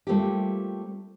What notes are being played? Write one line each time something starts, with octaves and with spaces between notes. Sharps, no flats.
G3 A3 A#3 C4 F4 G4